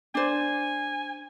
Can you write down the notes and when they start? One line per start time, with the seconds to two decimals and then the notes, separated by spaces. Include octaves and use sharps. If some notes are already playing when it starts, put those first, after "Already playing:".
0.15 D4 C5 G#5